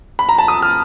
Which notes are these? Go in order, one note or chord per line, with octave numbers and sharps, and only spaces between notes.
B5
A#5
A5
D#6
F6